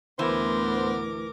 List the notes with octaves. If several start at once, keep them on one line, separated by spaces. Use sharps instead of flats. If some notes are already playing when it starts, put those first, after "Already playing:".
D2 A2 E3 B3 A#4 C5 D6